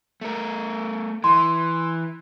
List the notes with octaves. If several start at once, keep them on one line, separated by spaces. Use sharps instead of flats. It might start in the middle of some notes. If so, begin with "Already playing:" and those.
A3 A#4
E3 C6